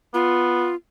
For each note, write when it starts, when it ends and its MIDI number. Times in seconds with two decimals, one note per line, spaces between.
0.14 0.70 59
0.14 0.75 65